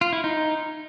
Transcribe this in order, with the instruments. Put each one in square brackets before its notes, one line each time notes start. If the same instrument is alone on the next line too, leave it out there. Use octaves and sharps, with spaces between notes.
[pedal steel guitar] F4
E4
D#4